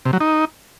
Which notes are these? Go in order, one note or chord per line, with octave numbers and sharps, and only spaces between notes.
C3
F#3
D#4